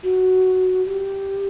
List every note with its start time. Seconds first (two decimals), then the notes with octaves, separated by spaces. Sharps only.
0.03 F#4
0.85 G4